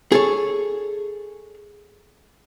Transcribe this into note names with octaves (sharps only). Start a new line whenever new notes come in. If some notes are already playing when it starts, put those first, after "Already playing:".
G#4 A4 C#5